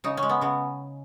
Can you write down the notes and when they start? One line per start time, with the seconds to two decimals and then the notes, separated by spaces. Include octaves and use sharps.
0.04 C#3 D#4
0.17 C#4
0.23 G#3
0.29 B3
0.41 C#3 B3